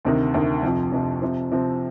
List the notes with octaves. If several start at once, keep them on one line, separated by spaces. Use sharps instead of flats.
D2 C3 D#3
D2 C3 D#3
F2 C3 F3
F2 C3 F3
C3 F3 C4
C3 F3 C4